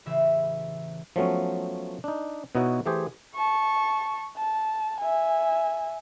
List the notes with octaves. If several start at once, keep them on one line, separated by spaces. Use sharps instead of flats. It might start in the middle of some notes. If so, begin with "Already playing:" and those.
A1 C#3 E3 E5 B5
F3 F#3 A3 B3 C#4
D4 D#4
B2 B3 D#4 E4 F#4 C#5
E3 A3 G4 G#4 C5
A5 C#6
A5
E5 G#5